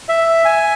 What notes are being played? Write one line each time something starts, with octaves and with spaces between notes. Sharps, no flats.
E5
G#5